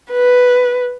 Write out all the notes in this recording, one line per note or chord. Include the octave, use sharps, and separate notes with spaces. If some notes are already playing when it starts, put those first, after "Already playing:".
B4